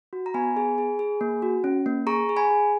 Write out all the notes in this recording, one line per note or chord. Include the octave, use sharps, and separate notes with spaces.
F#4
A#5
B3 G#5 B5
G#4
G#4
G#4
A#3
F#4
C#4
A#3
G#4 A#5 C#6
G#4
G#5 B5
G#4